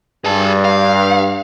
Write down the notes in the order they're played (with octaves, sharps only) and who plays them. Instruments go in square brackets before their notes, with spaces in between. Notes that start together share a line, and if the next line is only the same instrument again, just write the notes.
[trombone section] G2 [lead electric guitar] G#4 A5
[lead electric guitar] F5